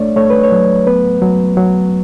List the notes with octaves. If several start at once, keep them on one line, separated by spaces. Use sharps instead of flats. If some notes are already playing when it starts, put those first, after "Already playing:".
Already playing: A3 D4 C#5 D5
A3 C#5
B4
C#5
F#3
B3 B4
F#3
F#3